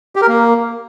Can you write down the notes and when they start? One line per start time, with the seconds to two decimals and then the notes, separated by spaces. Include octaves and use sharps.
0.16 G4
0.22 A#4
0.28 A#3